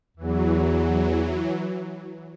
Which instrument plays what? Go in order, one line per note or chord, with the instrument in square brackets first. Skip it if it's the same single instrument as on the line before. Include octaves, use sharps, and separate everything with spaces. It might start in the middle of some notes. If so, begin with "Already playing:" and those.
[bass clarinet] E2 [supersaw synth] E3 F#3